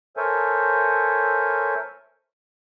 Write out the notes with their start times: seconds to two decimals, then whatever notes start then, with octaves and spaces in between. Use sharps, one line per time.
0.17 A4 A#4 C5 C#5 E5 G#5